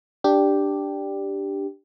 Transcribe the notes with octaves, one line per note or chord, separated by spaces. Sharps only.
D4 G4